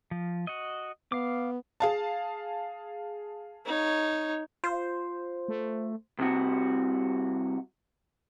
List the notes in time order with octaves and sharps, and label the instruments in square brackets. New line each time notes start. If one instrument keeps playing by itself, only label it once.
[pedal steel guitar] F3
F#4 D#5
[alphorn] B3 [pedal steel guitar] F5 D6
[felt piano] G#4 F5 A5
[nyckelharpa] D#4 C#5
[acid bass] F4 [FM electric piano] C5
[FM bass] A3
[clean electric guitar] C2 C3 F#4